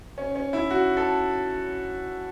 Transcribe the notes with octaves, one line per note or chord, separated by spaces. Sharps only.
C#4
C#4
E4
F#4
A4